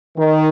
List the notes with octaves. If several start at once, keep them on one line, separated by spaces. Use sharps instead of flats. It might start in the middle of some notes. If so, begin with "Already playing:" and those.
D#3